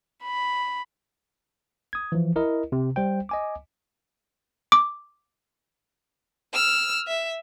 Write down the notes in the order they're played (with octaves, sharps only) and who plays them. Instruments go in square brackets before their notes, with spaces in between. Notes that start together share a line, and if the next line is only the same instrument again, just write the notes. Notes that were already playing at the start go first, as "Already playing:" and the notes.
[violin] B5
[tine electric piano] D#6 G#6
E3 F3
E4 A#4 D#5
C3
G3 C5 G5
D#5 G#5 D6
[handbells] D6
[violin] E6 F6
E5